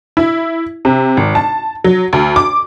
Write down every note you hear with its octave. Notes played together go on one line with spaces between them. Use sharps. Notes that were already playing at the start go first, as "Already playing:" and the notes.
E4
C3
G#1
A5
F#3
D2
D6